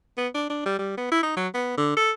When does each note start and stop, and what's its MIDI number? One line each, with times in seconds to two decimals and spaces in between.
0.17 0.28 59
0.34 0.45 62
0.50 0.62 62
0.66 0.78 55
0.78 0.95 55
0.97 1.10 59
1.11 1.22 64
1.23 1.36 63
1.36 1.47 54
1.54 1.73 59
1.77 1.96 50
1.96 2.11 69